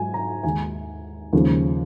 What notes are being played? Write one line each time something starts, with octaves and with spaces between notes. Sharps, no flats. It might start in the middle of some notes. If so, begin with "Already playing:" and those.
Already playing: G#2 F#3 G#5
A#5
D#2 D#3 G#3 G#5
D#2 C#3 F3 G#3